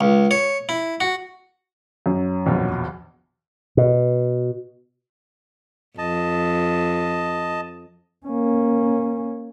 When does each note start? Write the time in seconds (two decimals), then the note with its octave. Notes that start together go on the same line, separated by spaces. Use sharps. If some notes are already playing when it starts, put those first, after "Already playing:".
0.01 C#2
0.31 C#5
0.69 E4
1.00 F#4
2.06 F#2 C#4
2.46 A#1 E2 B2
3.77 B2
5.98 F2 D#5 A5
8.26 A#3 C#4